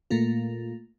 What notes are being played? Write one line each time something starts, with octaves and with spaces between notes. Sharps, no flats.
A#2 A3 A#3 F4